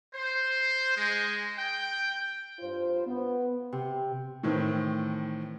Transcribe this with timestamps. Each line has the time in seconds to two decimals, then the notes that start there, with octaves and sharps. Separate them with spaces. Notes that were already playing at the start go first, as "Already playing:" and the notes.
0.14 C5
0.97 G#3
1.57 G5
2.59 G2 F4 C5
3.06 B3
3.72 C3
4.43 A2 D#3 E3 C4